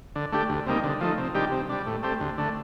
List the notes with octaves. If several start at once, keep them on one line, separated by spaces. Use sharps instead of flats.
D3
A3 D4 G4
D2
C3 G3 A#3 D#4
D3
F3 A3 D#4
C3
D#3 G3 D4 G4
C3
G3 D4
A2
A3 C4 G4
D2
D3 A3